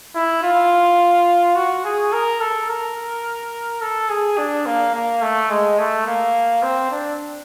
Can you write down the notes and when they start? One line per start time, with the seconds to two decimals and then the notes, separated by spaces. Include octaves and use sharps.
0.15 E4
0.43 F4
1.56 F#4
1.84 G#4
2.13 A#4
2.41 A4
2.69 A#4
3.82 A4
4.09 G#4
4.37 D4
4.66 A#3
4.94 A#3
5.22 A3
5.50 G#3
5.79 A3
6.07 A#3
6.63 C4
6.91 D4